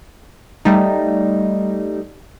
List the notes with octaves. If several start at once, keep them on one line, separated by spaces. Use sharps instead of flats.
G3 A3 D#4